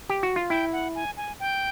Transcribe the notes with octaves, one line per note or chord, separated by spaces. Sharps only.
G4
F#4
F4
E4 G5
F#5
G#5
G#5
G5